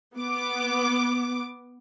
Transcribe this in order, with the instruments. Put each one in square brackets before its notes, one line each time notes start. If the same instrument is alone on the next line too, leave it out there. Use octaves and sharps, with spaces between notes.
[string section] B3 D6